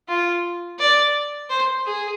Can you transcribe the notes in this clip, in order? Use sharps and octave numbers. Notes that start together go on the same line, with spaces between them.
F4
D5
C5
G#4